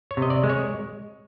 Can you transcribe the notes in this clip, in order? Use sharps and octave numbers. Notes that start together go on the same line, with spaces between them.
C#5
C3
D#5
D5
G#3
C#5